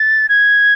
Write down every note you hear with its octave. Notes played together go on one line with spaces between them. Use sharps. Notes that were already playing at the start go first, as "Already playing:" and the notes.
Already playing: A6
G#6